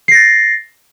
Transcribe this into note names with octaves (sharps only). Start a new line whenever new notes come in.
A6 A#6 C7